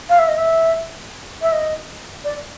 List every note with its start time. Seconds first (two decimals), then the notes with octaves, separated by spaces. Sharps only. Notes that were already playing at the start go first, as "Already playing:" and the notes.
0.09 F5
0.19 E5
0.29 D#5
0.38 E5
1.42 E5
1.52 D#5
2.24 D5